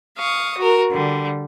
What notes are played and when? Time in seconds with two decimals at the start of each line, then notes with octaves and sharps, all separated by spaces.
0.18 F5 C#6 D#6
0.57 F#4 A#4
0.93 D3 G3